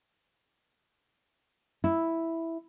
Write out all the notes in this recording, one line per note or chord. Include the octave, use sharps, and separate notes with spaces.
E4